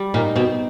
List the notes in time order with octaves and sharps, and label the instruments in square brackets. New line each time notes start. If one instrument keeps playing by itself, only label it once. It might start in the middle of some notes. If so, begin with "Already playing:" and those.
Already playing: [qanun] G3
[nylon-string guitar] A#2 [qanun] D#4
[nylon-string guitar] B2 [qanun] C4